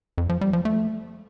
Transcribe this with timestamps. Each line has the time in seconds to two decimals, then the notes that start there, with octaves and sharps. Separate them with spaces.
0.18 F2
0.29 F3
0.41 G3
0.53 F3
0.65 A3